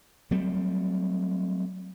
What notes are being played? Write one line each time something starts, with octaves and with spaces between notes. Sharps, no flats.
F#3 G3 A3 C4